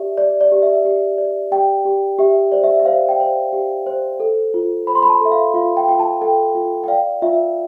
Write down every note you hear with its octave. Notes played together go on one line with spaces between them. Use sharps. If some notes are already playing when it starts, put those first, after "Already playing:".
Already playing: G4 D5 E5
D5
D5
G4
E5
G4
D5
G4 G5
G4
G4 E5
C5 D5
E5
E5
C5 F5
G5
C5
G4
C5
A4
F4
C5 B5
C6
B5
A5
A4 E5
F5
F4 F5
G5
F4 G5
A5
A4 G5
F4
G5
D5 F5
F4 E5